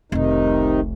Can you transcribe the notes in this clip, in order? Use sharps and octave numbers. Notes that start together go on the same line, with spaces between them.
F1 C2 C3 D#3 D#4